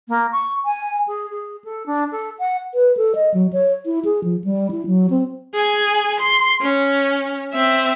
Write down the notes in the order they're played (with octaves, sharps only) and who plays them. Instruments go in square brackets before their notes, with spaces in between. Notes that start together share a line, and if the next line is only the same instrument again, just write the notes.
[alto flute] A#3
C#6
G#5
G#4
G#4
A4
D4
A4
F#5
[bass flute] B4
A4
D#5
F#3
C#5
E4
G#4
F3
G3
E4
F#3
C4
[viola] G#4 G#5
C6
C#4
C4 E5